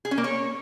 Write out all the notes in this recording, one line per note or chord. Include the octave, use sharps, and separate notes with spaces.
G#4
C#4
A#3
C#5